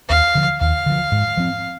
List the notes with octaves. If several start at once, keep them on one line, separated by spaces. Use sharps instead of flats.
D#2 F5
D3 F3
D#2 F5
D3 F3
G#2
F3 C4